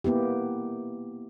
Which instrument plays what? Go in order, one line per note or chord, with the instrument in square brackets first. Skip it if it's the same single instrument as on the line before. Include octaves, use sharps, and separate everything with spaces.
[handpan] A#3 B3 E4 G4